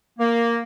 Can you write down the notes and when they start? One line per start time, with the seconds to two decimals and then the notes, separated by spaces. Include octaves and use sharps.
0.19 A#3